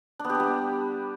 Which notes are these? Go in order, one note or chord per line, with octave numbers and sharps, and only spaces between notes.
D4
B3
G4
D4
G3